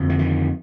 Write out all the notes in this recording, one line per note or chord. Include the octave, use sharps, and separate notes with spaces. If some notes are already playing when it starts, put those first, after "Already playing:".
Already playing: F2 D3
E3
D#3